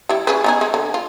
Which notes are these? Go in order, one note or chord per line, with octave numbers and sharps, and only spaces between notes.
G3 E4
C#4 G#4 B4
B3 D#4 G#4
G#3
D3
F4